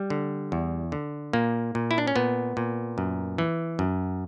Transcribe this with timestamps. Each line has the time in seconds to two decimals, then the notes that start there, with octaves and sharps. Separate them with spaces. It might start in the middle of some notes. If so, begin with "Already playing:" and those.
Already playing: G3
0.10 D3
0.52 E2
0.92 D3
1.33 A#2 A#3
1.75 A#2
1.91 E4
1.98 D4
2.07 C#4
2.16 A#2 B3
2.57 A#2
2.98 F#2
3.38 E3
3.79 F#2